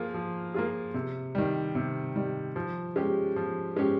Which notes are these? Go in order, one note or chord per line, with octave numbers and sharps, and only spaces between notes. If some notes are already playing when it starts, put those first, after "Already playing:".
Already playing: F3 A#3 F4 G#4
F3
A#3 F4 G#4
C3
D#3 G3
C3
D#3 G3
F3
G#3 C#4 G4
F3
G#3 C#4 G4